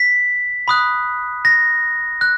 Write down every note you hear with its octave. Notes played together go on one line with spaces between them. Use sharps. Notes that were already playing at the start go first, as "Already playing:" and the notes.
Already playing: B6
B5 D#6 F#6
A#6
F#6